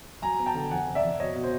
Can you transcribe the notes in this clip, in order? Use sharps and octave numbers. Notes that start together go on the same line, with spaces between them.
F#3 G#5 A#5
B3
G5 A5
D3
F2 F#5 G#5
C3
D5 E5
F2
B2 C#5 D#5
B2
C5